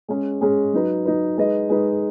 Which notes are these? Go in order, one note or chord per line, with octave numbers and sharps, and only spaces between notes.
G#3 C#4 G#4
G#3 C#4 G#4
F#3 D#4 B4
F#3 D#4 B4
G#3 D#4 B4 D#5
G#3 D#4 B4 D#5